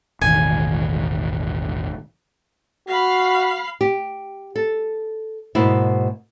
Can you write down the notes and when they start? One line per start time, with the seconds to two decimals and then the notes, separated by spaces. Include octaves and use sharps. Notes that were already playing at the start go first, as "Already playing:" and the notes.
0.21 E1 A1 D#3 G#5
2.88 F#4 F5 B5
3.81 G4
4.56 A4
5.55 G#2 B2 A#3 E4